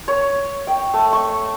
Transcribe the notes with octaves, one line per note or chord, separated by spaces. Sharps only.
C#5
G5
A3
C#6